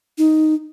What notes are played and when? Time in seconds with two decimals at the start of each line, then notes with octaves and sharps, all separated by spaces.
0.18 D#4